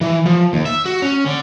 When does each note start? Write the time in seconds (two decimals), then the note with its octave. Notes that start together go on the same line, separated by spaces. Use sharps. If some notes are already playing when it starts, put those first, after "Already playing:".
0.01 E3
0.26 F3
0.53 D#2
0.66 E5
0.86 F#4
1.02 C#4
1.27 D3